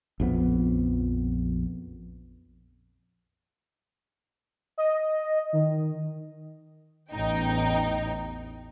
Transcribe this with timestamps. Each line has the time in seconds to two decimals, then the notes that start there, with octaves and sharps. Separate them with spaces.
0.20 A#1 F2 B3
4.78 D#5
5.53 D#3
7.10 A1 E2 D#4 G5